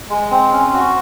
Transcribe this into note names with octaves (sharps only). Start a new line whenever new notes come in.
G#3
C4
C#4
F#4